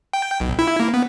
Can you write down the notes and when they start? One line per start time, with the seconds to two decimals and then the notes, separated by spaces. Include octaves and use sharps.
0.13 G5
0.40 B1
0.59 E4
0.80 A#3
0.94 B3